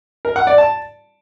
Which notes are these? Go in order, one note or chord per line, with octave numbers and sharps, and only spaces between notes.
A#4
F#5
D5
A5